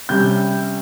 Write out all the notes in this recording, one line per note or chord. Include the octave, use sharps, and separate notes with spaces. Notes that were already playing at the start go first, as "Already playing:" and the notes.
C3 G3 C#4 G6